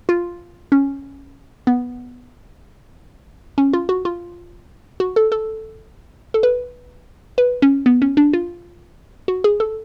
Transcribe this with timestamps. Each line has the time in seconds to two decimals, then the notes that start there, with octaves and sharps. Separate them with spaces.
0.09 F4
0.72 C#4
1.67 B3
3.58 C#4
3.73 F4
3.89 F#4
4.05 F4
5.00 F#4
5.16 A4
5.32 A4
6.34 A4
6.43 B4
7.38 B4
7.62 C#4
7.86 B3
8.02 C#4
8.17 D4
8.33 F4
9.28 F#4
9.44 G#4
9.60 A4